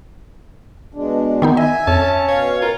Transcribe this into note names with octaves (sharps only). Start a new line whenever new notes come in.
B2 G#3 D4
D#3 B3 D#4
D#5 E5 G#5
F2 C#4 A5
B2 C#5 F5
F4 A#4